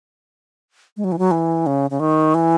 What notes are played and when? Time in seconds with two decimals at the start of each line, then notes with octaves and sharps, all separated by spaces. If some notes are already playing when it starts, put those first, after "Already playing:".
0.97 G#3
1.04 F#3
1.12 E3
1.19 F#3
1.31 E3
1.66 C#3
1.90 C#3
2.00 D#3
2.34 E3